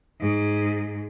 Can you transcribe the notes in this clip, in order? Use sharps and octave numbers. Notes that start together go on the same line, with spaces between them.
G#2